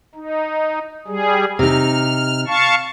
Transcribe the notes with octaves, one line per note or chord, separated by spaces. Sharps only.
D#4
G3 G#4
C3 D#4 F6
F5 A5 C#6